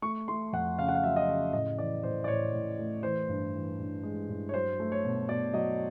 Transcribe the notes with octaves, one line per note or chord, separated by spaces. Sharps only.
A3 C#6
A3 C6
F2 F#5
C#3 F5
F#5
F5
F#3 E5
D#5
C#3 E5
A2 D#5
E3 D5
A2 C5
D5
A2 C#5
A2
A3
E3 C5
G2
E3
G2
G#3
G2
C#5
F#3 C5
A3
C#5
B2
B2 D5
F#3 D#5